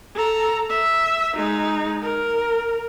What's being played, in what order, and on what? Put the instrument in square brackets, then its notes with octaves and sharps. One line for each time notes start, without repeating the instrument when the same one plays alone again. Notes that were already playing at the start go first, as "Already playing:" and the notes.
[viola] A4 A#5
E5
G#3 D#4
A#4